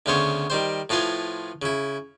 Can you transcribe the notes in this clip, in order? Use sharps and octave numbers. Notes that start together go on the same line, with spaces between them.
D2 C#3 B3 C5 C#5
D#3 G3 C5
A2 F3 F4 B4 G#5
C#3 E4